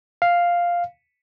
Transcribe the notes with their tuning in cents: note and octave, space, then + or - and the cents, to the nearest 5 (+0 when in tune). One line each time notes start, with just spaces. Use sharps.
F5 +0